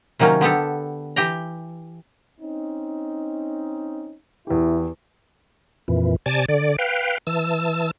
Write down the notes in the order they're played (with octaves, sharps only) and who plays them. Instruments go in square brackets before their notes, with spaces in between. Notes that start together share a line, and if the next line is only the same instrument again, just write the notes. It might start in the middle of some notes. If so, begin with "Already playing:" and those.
[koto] C3 D#3 F#3 A#3 C#4
D3 B3 G4 A4
E3 G4 G5 A#5
[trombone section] C4 C#4 D#4
[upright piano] E2 G4 [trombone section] E4
[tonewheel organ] F2 A#2 E3
C3 D5 G#5 A5 A6
D3 D5
B4 F5 G5
E3 A5 E6